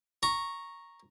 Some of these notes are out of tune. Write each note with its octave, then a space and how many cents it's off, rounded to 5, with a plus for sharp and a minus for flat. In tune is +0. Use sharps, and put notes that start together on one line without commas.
A#5 +0 C#6 -10